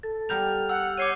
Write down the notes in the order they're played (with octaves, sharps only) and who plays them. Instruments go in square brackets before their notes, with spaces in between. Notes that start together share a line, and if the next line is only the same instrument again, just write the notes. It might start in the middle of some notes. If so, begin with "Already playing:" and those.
[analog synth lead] A4 [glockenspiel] A6
[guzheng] G3 B3 A#4 [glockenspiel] F6 G6 F7
[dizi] F#5 [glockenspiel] E6
[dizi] C#5 [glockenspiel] D6 C7 D#7 [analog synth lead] G6